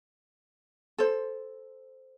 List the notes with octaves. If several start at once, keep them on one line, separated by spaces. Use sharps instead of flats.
A4 C5